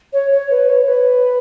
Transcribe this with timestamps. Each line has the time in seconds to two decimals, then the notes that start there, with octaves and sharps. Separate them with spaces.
0.12 C#5
0.31 C#5
0.50 B4
0.69 C#5
0.88 B4